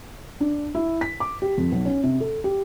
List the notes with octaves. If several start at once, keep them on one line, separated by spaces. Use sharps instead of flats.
D4
E4
B6
D6
G4
F2
B1
C#4
C3
A4
G4